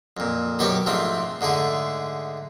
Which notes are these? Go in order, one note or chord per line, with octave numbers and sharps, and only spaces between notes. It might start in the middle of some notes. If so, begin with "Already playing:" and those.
F2 A#2
F#2 B2 D#3 G4 D5 C#6
G#2 F3 A3 C4 D4
G#2 D3 A3 G#4